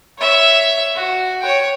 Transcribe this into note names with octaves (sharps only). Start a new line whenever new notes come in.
C#5 E5
F#4
C#5 G5